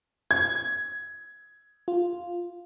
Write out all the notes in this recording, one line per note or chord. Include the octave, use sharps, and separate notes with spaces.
G#6
F4